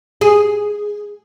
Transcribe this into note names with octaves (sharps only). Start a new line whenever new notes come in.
G#4